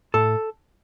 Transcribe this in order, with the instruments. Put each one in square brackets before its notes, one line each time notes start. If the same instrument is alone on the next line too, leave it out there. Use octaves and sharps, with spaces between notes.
[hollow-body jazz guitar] A2 A4